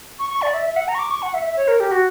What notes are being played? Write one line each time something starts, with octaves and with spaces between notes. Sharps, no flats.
C#6
C#6
D5
E5
E5
F#5
A#5
C#6
D6
C#6
F#5
E5
E5
C#5
A#4
G4
F#4